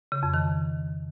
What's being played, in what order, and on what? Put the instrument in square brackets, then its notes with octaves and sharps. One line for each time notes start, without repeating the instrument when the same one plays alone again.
[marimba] C#3
F2
D#3